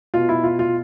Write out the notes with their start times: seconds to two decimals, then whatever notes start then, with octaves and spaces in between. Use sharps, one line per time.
0.14 B2 F4
0.29 E4
0.44 F4
0.59 F4